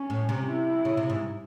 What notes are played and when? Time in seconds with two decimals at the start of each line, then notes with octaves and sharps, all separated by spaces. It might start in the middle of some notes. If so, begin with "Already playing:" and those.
Already playing: C#4
0.10 A2
0.29 C3
0.47 E4
0.85 C#3
0.97 C3
1.09 G#2